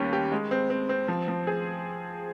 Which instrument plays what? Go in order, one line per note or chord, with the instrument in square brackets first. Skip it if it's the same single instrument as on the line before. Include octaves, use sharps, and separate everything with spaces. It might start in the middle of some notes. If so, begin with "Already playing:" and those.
Already playing: [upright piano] D#2 G3 C#4 G4
G4
G#3
C4
C4
C4
F3
F3
G#4